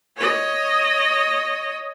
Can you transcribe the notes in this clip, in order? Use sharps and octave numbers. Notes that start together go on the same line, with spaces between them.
C#5 D#5